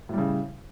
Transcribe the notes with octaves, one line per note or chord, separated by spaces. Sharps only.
A2 C#3 G3